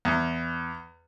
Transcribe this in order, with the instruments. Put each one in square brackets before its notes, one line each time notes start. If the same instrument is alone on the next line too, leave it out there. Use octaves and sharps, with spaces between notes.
[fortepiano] E2